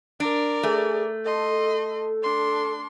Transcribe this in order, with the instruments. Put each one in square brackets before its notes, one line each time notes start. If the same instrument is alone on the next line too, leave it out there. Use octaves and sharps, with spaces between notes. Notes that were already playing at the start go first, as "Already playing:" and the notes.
[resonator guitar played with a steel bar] D4 [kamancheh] A#4 D5
[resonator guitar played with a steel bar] A3 [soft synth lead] G#4
[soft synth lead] A4 [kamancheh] D#5 C6
[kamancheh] D4 C6